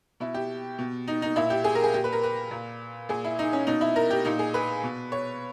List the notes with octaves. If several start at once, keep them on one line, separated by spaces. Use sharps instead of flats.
B2 E4
G4
B2
D#4
D#4
A#2 E4
G4
G#4
A#4
G#4
A#2 G4
B4
A#4
B4
A#2
A#2 G#4
E4
D#4
C#4
B2 D#4
E4
A#4
G4
A#2 D#4
G#4
B4
B2
C#5